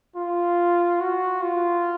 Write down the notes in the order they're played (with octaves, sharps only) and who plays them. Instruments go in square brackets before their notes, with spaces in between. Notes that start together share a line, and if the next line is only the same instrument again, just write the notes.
[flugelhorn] F4
F#4
F4